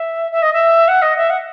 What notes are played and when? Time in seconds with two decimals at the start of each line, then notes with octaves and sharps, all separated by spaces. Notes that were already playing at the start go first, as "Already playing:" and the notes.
Already playing: E5
0.32 E5
0.42 D#5
0.53 E5
0.88 F#5
1.02 D#5
1.17 E5
1.30 F#5